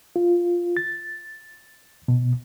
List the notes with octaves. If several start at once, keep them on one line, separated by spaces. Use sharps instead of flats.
F4
A6
B2